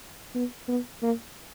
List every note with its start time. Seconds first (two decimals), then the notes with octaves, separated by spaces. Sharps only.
0.35 B3
0.69 B3
1.03 A#3